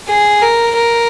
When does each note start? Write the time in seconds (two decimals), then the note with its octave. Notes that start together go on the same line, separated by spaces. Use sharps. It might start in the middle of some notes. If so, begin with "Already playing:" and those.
0.08 G#4
0.42 A#4
0.77 A#4